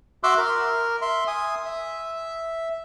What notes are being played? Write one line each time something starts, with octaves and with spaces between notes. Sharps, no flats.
F#4 E5 C6 D6 E6 F#6
A#4
E5 C6
G#5 D#6
E5